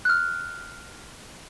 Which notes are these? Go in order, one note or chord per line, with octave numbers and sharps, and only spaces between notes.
F6 F#6